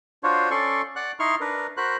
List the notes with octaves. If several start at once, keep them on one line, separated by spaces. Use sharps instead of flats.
D4 F4 F#4 C5 C#5
C#4 A4 D5 C6 C#6
D5 F#5 F#6
D#4 E4 C6 C#6 F6
D4 A#4 B4
F#4 A#4 C5 B5 F#6